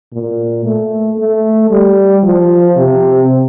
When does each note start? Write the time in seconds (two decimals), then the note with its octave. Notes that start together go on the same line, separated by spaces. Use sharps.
0.13 A#2
0.65 A3
1.18 A3
1.70 G3
2.23 F3
2.77 C3